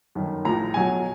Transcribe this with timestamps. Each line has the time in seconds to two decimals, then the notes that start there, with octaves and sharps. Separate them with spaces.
0.15 G1 F#2 D#3
0.45 A#1 A2 F3 A#5
0.74 B1 B2 F#3 G#5